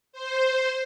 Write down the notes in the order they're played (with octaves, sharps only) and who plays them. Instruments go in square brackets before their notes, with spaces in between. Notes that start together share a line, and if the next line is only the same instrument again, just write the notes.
[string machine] C5